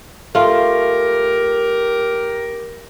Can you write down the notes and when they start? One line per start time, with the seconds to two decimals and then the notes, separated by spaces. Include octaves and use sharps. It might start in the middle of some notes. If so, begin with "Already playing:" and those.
0.35 A3 F4 G4 A#4